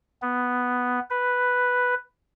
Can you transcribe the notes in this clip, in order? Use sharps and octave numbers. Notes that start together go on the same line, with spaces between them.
B3
B4